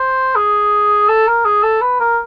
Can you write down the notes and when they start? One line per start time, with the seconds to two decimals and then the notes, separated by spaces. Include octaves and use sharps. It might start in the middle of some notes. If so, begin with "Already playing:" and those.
Already playing: C5
0.36 G#4
1.09 A4
1.28 A#4
1.45 G#4
1.63 A4
1.82 B4
2.00 A#4